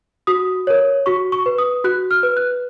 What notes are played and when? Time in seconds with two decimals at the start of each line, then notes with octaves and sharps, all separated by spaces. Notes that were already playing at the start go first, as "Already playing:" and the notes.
0.27 F#4 D#6
0.67 A#4 C#5
1.06 F#4 C#6
1.32 C#6
1.46 B4
1.58 D#6
1.84 F#4 F#6
2.11 F6
2.23 B4
2.37 F#6